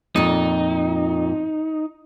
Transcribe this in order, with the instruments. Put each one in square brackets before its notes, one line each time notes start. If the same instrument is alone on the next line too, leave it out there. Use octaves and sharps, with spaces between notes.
[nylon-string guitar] F2 A#2 [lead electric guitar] D#4